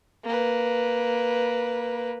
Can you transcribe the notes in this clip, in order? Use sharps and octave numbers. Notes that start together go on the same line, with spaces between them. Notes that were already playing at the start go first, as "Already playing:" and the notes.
A#3 B4